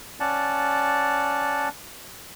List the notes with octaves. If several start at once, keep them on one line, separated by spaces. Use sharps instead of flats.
C#4 D5 F#5 A5